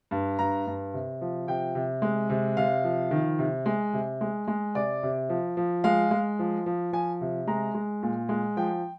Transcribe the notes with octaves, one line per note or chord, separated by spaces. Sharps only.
G2
G2 A#5
G2
C3
F3
C3 G5
C3
G#3
C3
C3 F5
F3
D#3
C3
G#3
C3
G#3
G#3
C3 D5
C3
F3
F3
G#3 F5
G#3
F3
F3
F3 G#5
C3
G#3 A#5
G#3
A#2
G#3
F3 G5